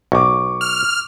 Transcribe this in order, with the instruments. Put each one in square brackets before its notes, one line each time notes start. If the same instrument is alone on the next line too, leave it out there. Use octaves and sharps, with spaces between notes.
[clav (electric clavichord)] B1 [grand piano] C#6 D6
[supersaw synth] F6